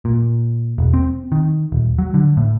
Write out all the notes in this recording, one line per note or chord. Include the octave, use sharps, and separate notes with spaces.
A#2
E1
C4
D#3
D#1
F#3
D3
A2